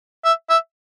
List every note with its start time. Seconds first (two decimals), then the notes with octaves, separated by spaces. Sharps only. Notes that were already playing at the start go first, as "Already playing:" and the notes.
0.25 E5
0.50 E5